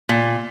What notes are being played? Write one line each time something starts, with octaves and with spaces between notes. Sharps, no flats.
A#2